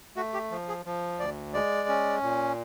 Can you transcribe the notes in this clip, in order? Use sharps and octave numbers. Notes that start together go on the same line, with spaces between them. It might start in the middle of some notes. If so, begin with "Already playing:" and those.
A3 F#4
G4
F3
G#4
F3
D2 D5
G#3 D5
C#4
A#2